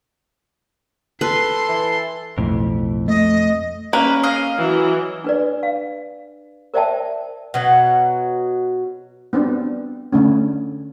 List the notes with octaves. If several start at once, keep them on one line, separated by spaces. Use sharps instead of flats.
A4 B4 C6
E3
B1 F2 A2
A3 D#5
A#3 C#4 B4
D#5 F5
E3 F#3
D4 B4 D5
F5
A#4 C5 D5 E5 G5 A5
B2 F#3
B3 C4 D4
D3 A3 C#4